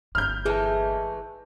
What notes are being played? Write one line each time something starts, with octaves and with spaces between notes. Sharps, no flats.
G1 A#3 F6 G6
E3 G#3 A3 G#4 A5